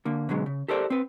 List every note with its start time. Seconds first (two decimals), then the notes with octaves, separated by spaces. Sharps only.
0.05 D3 A#3
0.29 B2 D3 F#3 G#3
0.46 C#3
0.68 G4 A4 A#4 C5 D5
0.90 C4 B4